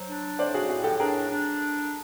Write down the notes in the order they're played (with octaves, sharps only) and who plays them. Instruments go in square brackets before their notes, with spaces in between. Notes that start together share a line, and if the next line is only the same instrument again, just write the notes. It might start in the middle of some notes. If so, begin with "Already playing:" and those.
Already playing: [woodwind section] F#3 [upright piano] C5
[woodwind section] D4
[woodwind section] A2 [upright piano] C5 D5
[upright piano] F#4 G#4
[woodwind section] A2 [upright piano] F#4 G#4
[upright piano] G4 A4
[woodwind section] D4 [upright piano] G#4 A#4
[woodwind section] D4